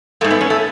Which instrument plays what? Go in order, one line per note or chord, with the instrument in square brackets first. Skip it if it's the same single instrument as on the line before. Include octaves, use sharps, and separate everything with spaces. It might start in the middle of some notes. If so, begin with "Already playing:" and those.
[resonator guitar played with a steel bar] G#2 G#3 A3
B3
C#4
A3